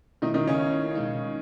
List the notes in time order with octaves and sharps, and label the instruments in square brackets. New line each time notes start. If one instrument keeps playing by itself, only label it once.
[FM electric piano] B2 A3 E4 [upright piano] D#3 D#4
[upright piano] D#3 D#4
C#3 C#4
[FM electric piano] B2 G#3 D#4